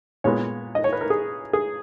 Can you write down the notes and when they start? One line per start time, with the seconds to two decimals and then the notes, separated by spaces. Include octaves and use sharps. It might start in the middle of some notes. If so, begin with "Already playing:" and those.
0.24 A#2 G#3 B3 C#5
0.75 D#5
0.84 C#5
0.93 B4
1.01 A#4
1.10 G#4
1.53 G#4